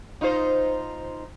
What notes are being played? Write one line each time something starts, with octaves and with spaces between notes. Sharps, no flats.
D#4 F4 C5